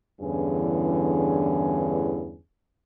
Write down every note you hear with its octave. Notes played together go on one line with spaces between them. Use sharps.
E2 G2 D3 E3 C#4 G#4